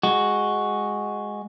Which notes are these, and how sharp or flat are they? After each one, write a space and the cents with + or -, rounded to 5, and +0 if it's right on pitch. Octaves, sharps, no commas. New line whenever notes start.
G#3 +0 F#4 +0